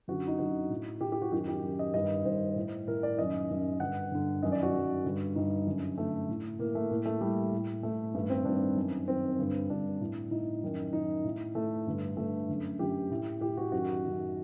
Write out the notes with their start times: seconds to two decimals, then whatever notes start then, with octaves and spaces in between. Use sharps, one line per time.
0.08 F#2 D3 F#4
0.28 D#4
0.39 F#2 D3 F#4
0.70 A2
1.01 A2 G4
1.12 G4
1.22 F#4
1.32 F#2 D#3 G4
1.48 G4
1.63 F#2 D#3
1.79 D#5
1.94 G2 D#3 D#5
2.25 G2 D#3 C5
2.56 A2
2.87 A2 A#4
3.03 D5
3.18 F#2 D#3 D#5
3.50 F#2 D#3
3.80 G2 D3 F#5
4.12 G2 D3
4.43 F#2 D#3 D#5
4.52 D5
4.63 F#4
4.73 F#2 D#3
5.04 G2 D3
5.35 G2 D3 D#4
5.66 F#2 D3
5.97 F#2 D3 A3
6.29 A2
6.59 A2 A#3
6.75 A3
6.90 A2 A#3
7.06 A3
7.21 A2 G3
7.52 A2
7.83 A2 A3
8.14 G2 D#3 A3
8.30 C4
8.45 G2 D#3 D4
8.77 F#2 D#3
9.08 F#2 D#3 C4
9.39 G2 D3
9.70 G2 D3 D4
10.00 A2
10.31 A2 D#4
10.63 F#2 D#3
10.93 F#2 D#3 D#4
11.24 A2
11.55 A2 A3
11.87 G2 D3
12.17 G2 D3 A3
12.49 F#2 D3
12.79 F#2 D3 G4
13.11 A2
13.41 A2 G4
13.57 F#4
13.72 F#2 D#3 F#4
14.04 F#2 D#3